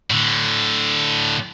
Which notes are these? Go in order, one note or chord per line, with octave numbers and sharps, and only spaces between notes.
A2 D3